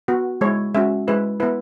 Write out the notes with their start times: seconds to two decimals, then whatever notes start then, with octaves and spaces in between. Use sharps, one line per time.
0.08 B3 F#4
0.41 G#3 E4 C#5
0.75 G#3 C#4 F#4 E5
1.08 G#3 E4 B4
1.40 B3 E4 B4